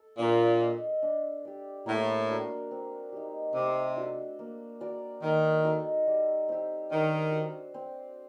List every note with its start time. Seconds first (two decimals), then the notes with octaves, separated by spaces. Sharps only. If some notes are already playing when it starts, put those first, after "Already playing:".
Already playing: A4
0.18 A#2 D4
0.61 A4 D#5
1.02 D4
1.45 G4 D5
1.86 A2 A#3
2.29 D4 F#4 A#4
2.71 C4
3.12 D#4 G4
3.54 C3 A3
3.96 D4 F#4 A4
4.39 A#3
4.81 F#4 A#4 D5
5.23 D#3 A#3
5.65 D#4 F#4 A4
6.07 G3
6.49 C4 G4
6.90 D#3 D4
7.32 F#4
7.37 C5
7.74 C4